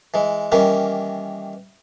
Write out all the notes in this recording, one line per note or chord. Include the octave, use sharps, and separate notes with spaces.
E3 G#3
D#3 E3 G3 A#3 C#4